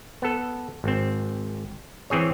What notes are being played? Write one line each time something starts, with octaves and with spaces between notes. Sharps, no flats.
B3 A4
G#1 C4
E3 C4 G#4 C#5